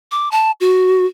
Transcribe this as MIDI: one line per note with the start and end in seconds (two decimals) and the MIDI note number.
0.11 0.31 86
0.31 0.51 81
0.61 1.06 66